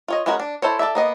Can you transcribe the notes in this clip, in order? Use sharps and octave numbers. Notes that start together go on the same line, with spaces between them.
F4 C#5 D#5
G#3 B3 C#4 F#4 A#4
D4
E4 A4 C5 C#5
A4 B4 D5 E5
A#3 B3 D#5